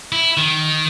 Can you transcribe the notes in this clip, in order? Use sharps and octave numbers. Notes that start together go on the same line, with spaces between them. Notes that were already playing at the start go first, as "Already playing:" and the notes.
E4
D#3